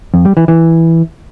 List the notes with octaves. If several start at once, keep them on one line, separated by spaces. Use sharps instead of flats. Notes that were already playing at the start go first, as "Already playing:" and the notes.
F2
G3
E3
E3